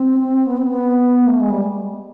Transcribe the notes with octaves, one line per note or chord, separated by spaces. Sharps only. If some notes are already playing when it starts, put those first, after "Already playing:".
Already playing: C4
B3
C4
B3
A#3
A3
G#3
G3